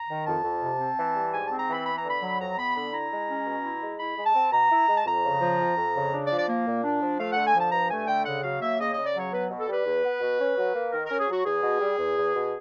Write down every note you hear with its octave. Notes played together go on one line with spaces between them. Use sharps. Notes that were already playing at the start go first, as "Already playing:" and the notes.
Already playing: A#5
D#3
F2 A5
F2
C3
C4
E3
G3
G#2 G#5
C4 A5
A#5
E3 B5
B3 B5
A#5
D3
B5
F#3
F2 A#5
B3 B5
D3 B5
E4 A#5
G#3
C#4
B2
E4
G#3
E4 B5
G#3
A5
C4
B2 A#5
E4
G#3
A5
F2 A#5
C#3
F3
F2
F2
C#3
D4
D5
F3
D5
A#3
A#2
D4
F3
A3 F5
D3 F#5
G#5
F3 A5
G2 A#5
A3 G#5
D3 G5
C#3 F#5
F#3 F5
A#3 E5
C#3 D#5
C#3 D#5
D5
F#3 C#5
B3 B4
B2
A4
G3 B4
E2
B3
B2
C#4
F#3
A#3
D#3 A#4
C#4 A#4
G#4
F#3 F#4
E2 G#4
B2
G3
E2
E2
B2